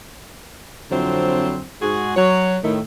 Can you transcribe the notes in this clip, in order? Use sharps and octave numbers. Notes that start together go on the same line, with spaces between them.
F2 D3 F#3 C4 E4 C5
G#2 F#4 G#4
F#3 C#5
A2 D#3 A3